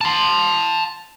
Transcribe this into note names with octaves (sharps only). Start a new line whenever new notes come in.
A5 C6